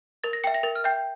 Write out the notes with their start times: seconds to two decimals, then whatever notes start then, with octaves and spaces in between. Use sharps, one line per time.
0.24 A#4 A6
0.33 A#6
0.44 E5 G5 C#7
0.54 A#6
0.63 A#4 A6
0.75 F6
0.84 E5 G5 G6